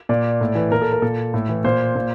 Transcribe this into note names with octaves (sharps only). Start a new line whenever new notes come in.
A#2 D5
A2
E3
A#2 A#4
A4
A#4
A#2 A4
A2
E3
A#2 C5
A#2